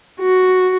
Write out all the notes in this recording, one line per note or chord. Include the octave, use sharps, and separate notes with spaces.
F#4